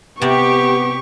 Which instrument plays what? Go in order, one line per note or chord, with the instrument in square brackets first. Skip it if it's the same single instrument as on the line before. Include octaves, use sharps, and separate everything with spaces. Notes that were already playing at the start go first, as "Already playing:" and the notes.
[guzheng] C3 D5 [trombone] B3 [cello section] G4 [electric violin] C#6